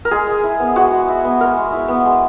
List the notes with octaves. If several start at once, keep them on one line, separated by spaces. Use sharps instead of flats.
A#4
G#3 G#4
G#3
E4
B3
G#3 F#4
G#3
E4
B3
G#3 A#4
G#3
E4
B3
G#3